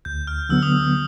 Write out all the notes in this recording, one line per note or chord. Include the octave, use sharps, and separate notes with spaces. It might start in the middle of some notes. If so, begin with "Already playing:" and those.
D2 G6
F6
D3 F#3 B3 E6
D#6
E6